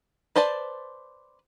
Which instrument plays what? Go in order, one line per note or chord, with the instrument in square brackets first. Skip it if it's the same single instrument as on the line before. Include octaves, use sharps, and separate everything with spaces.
[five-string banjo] B4 C5 D5 A5